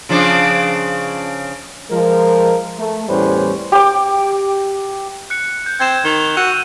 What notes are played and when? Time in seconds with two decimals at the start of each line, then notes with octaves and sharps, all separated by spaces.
0.09 C#3 F3 D4
1.90 F3 G#3 A#4
2.78 A3
3.08 E2 A2 G3 C#4 B4 C5
3.72 G4 D6
5.30 F#6 C#7
5.66 G6
5.80 C4 G#6 E7
6.05 D#3 F7 G7
6.37 F#4 E6 D#7